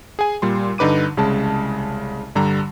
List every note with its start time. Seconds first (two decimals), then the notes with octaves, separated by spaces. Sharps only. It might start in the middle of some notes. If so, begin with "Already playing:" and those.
0.19 G#4 G#5
0.42 A#2 G3 C6
0.78 G2 D3 D#4 B4 D6 D#7
1.17 C2 C#3 G#3 A5
2.36 G2 D3 G3 A#5